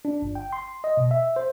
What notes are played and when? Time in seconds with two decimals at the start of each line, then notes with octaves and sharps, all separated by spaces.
0.05 D4
0.22 G1
0.35 G5
0.53 C6
0.84 D#5
0.97 B2
1.11 E5
1.36 C5